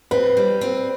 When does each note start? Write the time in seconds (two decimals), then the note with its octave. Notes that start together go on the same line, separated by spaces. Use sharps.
0.11 C4 B4
0.37 G3
0.61 C4